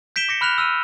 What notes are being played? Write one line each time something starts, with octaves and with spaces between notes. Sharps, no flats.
G6 B6 D7 E7 G7
D6 A#6 C#7
B5 F6 F#6 B6 F7
E6 F6 D#7